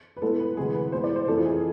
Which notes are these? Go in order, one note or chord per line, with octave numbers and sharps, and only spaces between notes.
B4
A2 G#3 B3 A4
B4
D2 C3 E3 G#3 G#4
B4
A2 G#3 B3 C5
D5
C5
F2 E3 A3 A4
F4
G#4